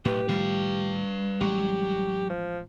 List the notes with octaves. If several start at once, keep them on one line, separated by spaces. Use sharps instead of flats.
B1 A2 G4 B4
A2 D#3 F3 G3 B4 F5
A1 F#3 G#3 G4
F3